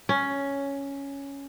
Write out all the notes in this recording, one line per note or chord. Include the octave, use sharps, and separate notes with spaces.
C#4